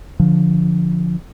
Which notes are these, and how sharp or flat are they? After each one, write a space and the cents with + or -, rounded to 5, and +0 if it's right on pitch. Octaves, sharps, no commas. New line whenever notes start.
D3 -5 F3 +0